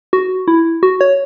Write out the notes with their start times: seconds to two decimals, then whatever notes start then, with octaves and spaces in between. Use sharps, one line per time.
0.13 F#4
0.48 E4
0.83 F#4
1.01 C#5